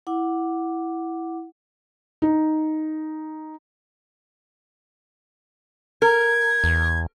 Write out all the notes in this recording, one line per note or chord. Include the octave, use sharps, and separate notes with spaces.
E4 F#5 D6
D#4
A#4 G#6
E2